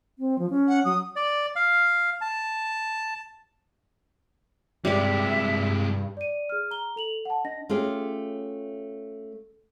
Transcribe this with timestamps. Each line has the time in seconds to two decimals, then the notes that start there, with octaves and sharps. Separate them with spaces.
0.19 C4
0.39 F3
0.50 C#4
0.68 F#5
0.85 F#3 D#6
1.16 D5
1.56 F5
2.21 A5
4.85 G2 C3 G3 G#3 D5 E5
6.17 D5 D#7
6.49 G#4 F6
6.71 A#5 G7
6.96 A4 F7 F#7
7.25 F#5 A5
7.45 D4 D#5 A#6
7.69 A3 C#4 F4 G4 G#4